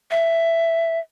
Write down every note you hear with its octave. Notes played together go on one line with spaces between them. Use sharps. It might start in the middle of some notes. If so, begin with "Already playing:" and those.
E5